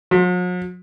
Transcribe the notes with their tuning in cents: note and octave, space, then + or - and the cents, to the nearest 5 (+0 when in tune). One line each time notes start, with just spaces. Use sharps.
F#3 -45